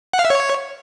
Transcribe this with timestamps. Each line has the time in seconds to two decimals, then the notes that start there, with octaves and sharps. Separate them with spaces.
0.13 F#5
0.19 F5
0.25 E5
0.30 C#5